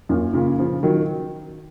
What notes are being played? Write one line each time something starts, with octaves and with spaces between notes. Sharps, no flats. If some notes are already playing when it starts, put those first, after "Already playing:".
F#2 A#2
A#2 C#3
C#3 F3
D#3 F#3